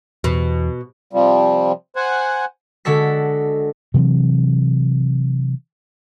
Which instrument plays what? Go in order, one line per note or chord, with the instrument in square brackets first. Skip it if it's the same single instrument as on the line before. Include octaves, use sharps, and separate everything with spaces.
[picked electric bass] E2 [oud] B2
[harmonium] C3 F3 G3
C5 F#5 G#5
[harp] D3 G#3 F#4 A4 B6
[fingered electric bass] C3 E3 F#3 C4